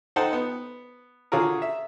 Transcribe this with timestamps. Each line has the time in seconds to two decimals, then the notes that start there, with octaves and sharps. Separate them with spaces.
0.16 D#4 A4 C5 F#5 G5 A5
0.33 B3
1.32 D3 C#4 F4 F#4 G#4 A#4
1.62 E5